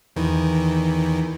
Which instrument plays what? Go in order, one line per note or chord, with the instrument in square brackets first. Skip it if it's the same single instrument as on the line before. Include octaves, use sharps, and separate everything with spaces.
[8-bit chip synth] E2 D#3 E3